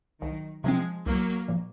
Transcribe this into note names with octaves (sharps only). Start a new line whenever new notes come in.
C2 D#3 F#3
C3 F3 F#3 G#3 C4
C2 F#3 A#3
A#2 F3 A#3